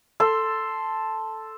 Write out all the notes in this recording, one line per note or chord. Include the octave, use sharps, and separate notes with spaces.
A4 C6